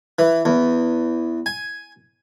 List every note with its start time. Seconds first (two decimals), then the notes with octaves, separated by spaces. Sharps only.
0.19 E3
0.45 E2
1.46 G#5